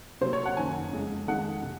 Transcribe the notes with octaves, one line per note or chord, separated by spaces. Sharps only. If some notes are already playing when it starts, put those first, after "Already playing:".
C3 F#3 A#3 C5
C#5
F#5
F#2 D#3 A#3 G#5
F2 C#3 G#3
F2 D#3 G#3 F#5
C3